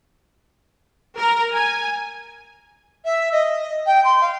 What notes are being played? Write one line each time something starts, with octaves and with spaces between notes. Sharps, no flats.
A#4
G#5
E5
D#5
G5
C6
F5